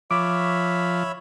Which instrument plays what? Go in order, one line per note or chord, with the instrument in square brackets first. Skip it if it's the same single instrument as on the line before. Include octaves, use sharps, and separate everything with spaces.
[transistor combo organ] F3 [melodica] C#5 E5 B5 [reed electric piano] D6